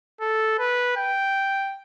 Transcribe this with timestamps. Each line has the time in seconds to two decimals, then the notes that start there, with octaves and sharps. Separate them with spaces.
0.21 A4
0.59 B4
0.97 G5